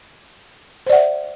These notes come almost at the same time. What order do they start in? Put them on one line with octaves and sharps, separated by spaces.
C5 D5 F#5 E5